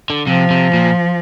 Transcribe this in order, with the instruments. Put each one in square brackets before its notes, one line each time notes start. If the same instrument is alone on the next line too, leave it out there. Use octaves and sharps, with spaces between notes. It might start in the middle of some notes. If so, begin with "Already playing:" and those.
[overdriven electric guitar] D3
[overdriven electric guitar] C3 [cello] F3
[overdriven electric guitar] C3
A#2